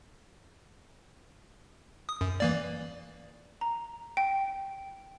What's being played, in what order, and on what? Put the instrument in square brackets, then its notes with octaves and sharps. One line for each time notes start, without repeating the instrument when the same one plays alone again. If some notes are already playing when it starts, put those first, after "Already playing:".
[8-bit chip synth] D#6
F#2
E3 A#3 D5
[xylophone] A#5
G5